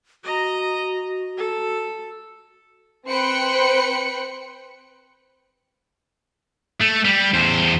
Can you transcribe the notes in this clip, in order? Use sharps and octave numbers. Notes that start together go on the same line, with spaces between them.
F#4 D#5 A#5
A4
C4 B4 C5 G5 F#6 C#7
A3
G3
E2 C5